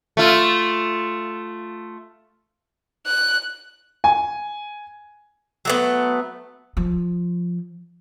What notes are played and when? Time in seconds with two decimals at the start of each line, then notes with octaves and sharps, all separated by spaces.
0.17 A3 F4
3.07 F#6
4.04 G#5
5.65 F#3 A3 B3
6.77 F3